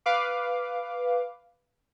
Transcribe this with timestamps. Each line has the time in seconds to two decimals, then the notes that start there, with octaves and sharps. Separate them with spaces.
0.06 B4 F5 D6